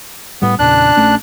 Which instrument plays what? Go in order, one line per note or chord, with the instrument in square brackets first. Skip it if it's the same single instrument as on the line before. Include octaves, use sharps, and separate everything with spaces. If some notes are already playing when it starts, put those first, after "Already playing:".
[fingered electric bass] A2 G3 [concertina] B3
[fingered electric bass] E2 A#2 C#3 [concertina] D4 F#6
[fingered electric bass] A#1 A3 C#4